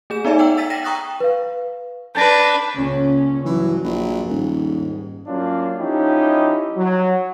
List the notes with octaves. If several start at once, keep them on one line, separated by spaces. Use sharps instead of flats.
A3 G#4 E7
B3 D#4 D5 E5 G#5
F#5 G5 E6
E6 A6 B6 D#7
G5 A#6 B6 E7
G5 A#5 C#6 D#6 F#6
B4 F5
D4 B4 G6 A6 A#6
C#2 A#2 C#4
G2 E3 F#3
A#1
D#1 G#2
F#3 A#3 C#4 D4 F4
F3 C#4 D#4 E4 G4
F#3